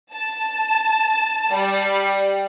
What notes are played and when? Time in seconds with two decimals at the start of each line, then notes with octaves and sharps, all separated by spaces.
0.14 A5
1.53 G3